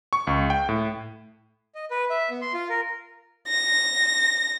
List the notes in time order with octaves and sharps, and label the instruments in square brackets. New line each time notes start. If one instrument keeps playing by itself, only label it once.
[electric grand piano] C#6
C#2
G5
A2
[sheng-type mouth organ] D#5
B4
E5
B3
C6
F4
A#4
[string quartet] A#6